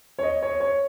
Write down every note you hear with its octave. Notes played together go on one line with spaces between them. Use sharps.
C#5
D#5
C#5
C#5